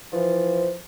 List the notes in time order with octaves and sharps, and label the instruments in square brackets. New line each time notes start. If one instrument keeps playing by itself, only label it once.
[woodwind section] E3 F3